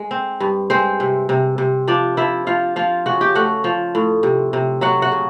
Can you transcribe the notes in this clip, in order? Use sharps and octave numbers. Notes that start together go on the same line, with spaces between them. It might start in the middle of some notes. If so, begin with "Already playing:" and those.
Already playing: G#3
C4
G2
G#3 C4 C5
C3
C3
C3
F3 D4 D5
F3 E4 E5
F3 F4 F5
F3 F4 F5
C#3 F#4 F#5
G4 G5
A3 F#4 F#5
F3
A2
C3
C3
F#3 F#4 F#5
F#4 F#5
C#3